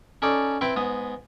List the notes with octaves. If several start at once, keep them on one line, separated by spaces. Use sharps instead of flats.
C#4 D#4 A4 D5
C4 E4 B4 G5
G#2 B3 D#6